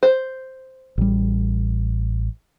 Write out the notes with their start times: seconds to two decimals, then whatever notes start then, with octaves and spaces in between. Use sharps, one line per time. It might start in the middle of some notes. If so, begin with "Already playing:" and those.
0.03 C5
0.98 A1 G3